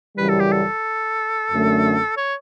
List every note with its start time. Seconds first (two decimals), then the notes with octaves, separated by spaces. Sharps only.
0.17 F#2 C#3 E3 G3 B4
0.29 A4
0.40 G4
0.52 A4
1.51 F#2 D3 A3
2.17 C#5